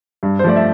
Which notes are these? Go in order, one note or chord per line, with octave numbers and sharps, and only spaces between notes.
G2
C5
F3 A3 D5
E5